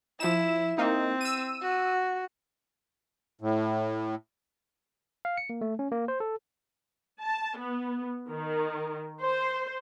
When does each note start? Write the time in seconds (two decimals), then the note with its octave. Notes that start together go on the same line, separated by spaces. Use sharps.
0.20 F3 E4 E7
0.78 A#3 C4 D#4
1.21 E6 D#7
1.62 F#4
3.41 A2
5.25 F5
5.37 C#7
5.50 A#3
5.61 A3
5.79 C#4
5.92 A#3
6.08 C5
6.20 A4
7.21 A5
7.56 B3
8.30 D#3
9.21 C5